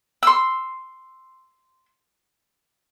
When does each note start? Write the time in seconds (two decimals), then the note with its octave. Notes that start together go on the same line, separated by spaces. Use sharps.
0.23 C6 E6